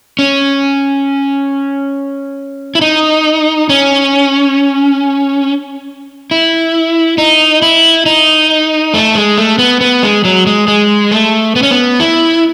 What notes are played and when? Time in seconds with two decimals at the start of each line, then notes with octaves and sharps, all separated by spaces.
0.19 C#4
2.75 E4
2.81 D#4
3.70 C#4
6.31 E4
7.18 D#4
7.62 E4
8.06 D#4
8.94 A3
9.15 G#3
9.38 A3
9.59 B3
9.81 B3
10.03 G#3
10.25 F#3
10.47 G#3
10.68 G#3
11.11 A3
11.56 B3
11.63 C#4
11.71 B3
12.00 E4